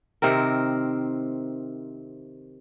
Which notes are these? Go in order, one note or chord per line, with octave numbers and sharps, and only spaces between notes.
C3 D#3 C4 A#4